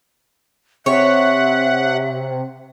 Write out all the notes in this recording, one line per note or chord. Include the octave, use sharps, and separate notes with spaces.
C3 C#5 E5 F#5